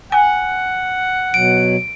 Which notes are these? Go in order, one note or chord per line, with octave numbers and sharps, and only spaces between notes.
F#5 G#5
B2 F#3 D7